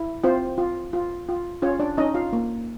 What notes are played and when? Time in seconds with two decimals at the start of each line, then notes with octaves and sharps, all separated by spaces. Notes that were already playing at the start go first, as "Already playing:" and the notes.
Already playing: E4
0.24 C4 F4 C5
0.58 F4
0.93 F4
1.29 F4
1.62 C#4 F4 C#5
1.80 D4 D5
1.97 C#4 D#4 D#5
2.14 F4 F5
2.33 A#3